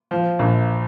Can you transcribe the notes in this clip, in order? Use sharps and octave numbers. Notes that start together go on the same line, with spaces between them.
F3
A#1